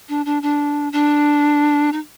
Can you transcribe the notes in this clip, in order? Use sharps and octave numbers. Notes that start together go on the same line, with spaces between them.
D4
D4
D4
D4
D#4